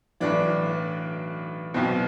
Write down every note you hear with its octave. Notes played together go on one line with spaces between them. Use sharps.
B1 A2 E3 D4
B1 B2 C4